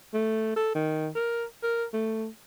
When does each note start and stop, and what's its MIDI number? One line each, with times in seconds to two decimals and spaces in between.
0.14 0.53 57
0.56 0.71 69
0.75 1.09 51
1.15 1.45 70
1.63 1.85 70
1.93 2.27 57